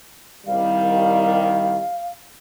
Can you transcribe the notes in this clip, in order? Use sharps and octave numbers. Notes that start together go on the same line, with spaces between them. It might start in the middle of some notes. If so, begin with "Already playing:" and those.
C2 D#3 G3 F5